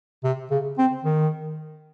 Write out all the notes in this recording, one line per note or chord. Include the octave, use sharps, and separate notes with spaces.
C3
C#3
C4
D#3